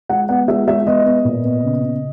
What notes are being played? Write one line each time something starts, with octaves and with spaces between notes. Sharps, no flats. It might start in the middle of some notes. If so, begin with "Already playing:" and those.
G#3 F#5
B3 F#5
G#3 E5
G#3 E5
B3 D#5
B3
A#2
B3
C#3
C#3